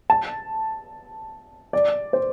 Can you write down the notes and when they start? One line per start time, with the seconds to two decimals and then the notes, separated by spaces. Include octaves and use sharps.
0.10 A5
1.73 D5
2.13 C5